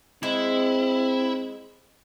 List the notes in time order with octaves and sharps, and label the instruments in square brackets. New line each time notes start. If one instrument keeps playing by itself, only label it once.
[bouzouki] G#3 [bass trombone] C4 [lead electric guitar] E4